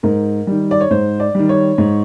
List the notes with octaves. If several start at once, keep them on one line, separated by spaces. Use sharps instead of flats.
G#2 A#4
D#3 G3
D5
C#5
G#2 C5
D5
D#3 G3
C#5
G#2